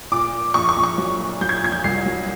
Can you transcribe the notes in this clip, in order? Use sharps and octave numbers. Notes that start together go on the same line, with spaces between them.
A#2 D6
A#2
A#1 C#6
C#6
A#1
C#6
F#3
A#2
F#3 G6
G#6
G6
A#1 G#6
G6
C2 C7
F#3